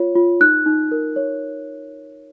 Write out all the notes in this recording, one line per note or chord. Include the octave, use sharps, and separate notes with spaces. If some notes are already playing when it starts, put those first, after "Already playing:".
Already playing: F4 C#5
F4
D#4 F#6
D#4
A#4
C#5